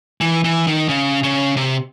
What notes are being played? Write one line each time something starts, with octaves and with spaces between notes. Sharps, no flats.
E3
E3
D#3
C#3
C#3
C3